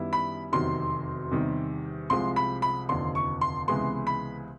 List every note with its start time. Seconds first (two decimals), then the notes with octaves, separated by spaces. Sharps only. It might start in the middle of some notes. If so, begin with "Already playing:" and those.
Already playing: F#2 D#3 G3 B3 E4
0.13 B5
0.52 F1 E2 C3 D#3 F#3 C6
1.31 E2 C3 D#3 G3
2.10 C2 C3 F3 G#3 C6
2.36 B5
2.62 B5
2.89 F1 D#2 D3 F3 C6
3.15 C#6
3.41 C6
3.68 C#2 C3 E3 G#3 B3 C6
4.07 B5